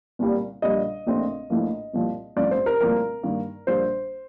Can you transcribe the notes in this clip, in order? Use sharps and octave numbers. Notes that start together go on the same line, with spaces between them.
C2 A#2 G3 A#3
A#1 A#2 G3 D#5
A#1 A#2 A3 C4
A#1 A2 F3 A#3
C2 A#2 F3
A1 G2 F3 A3 C4 D5
C5
A#4
C2 A#2 F3 A3 C4 A#4
G2 D#3 A#3
A#1 A#2 G3 A#3 C5